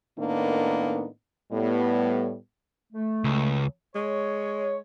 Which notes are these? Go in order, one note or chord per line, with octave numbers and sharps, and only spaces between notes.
A2 D#3 A#3 B3 D4 D#4
A2 G3 B3
A3
C#2
G#3 C#5